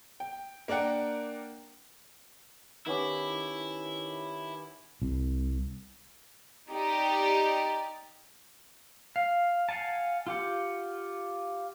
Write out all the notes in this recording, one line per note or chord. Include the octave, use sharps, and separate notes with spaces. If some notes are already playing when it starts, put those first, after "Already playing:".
G5
A#3 D4 A#4 F#5 G5
D#3 B3 C#4 E4 G4
C2
D#4 G4 D5
F5
F5 F#5 G#5 A5
F4 G4 F#5